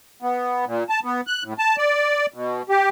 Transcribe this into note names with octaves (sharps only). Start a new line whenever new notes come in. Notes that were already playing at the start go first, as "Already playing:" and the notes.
B3
A#2
A5
B3
F#6
A2
A5
D5
B2
G4